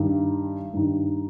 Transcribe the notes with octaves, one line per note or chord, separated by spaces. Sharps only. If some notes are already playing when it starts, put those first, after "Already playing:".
Already playing: G2 D#3
G2 D#3